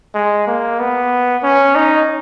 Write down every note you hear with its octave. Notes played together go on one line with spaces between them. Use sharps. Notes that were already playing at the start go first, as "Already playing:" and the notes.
G#3
A#3
B3
C#4
D#4